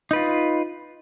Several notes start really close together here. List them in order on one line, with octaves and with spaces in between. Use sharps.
D#4 B4 F4